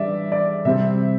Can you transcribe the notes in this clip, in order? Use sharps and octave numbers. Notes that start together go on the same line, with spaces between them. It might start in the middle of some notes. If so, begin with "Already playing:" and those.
Already playing: E3 G3 D4 D5 E5
D5
C3 G3 C4 E5